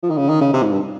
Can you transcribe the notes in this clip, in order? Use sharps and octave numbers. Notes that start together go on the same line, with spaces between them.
F3
D#3
C#3
D#3
C#3
C3
G#2
G2